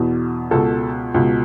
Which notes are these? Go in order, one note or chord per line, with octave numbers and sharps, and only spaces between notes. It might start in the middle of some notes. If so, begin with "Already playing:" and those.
Already playing: E2 B2
C#2 B2 A4
C#2 B2